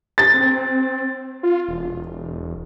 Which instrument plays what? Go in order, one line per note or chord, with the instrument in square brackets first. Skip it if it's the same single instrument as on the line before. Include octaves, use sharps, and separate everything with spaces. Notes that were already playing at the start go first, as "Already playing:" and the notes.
[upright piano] A6
[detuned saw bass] C4
F4
E1